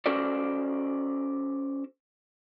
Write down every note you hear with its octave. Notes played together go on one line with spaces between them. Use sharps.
C#4 F#4 A4 C5 D5